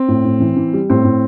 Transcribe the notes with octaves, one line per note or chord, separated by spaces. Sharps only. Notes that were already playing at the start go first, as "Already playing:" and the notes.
Already playing: C4
A2
A2
E3
E3
G3
A2 C4
A2